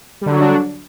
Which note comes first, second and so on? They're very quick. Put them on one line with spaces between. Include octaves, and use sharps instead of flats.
G3 D3 F#3 F#4 D4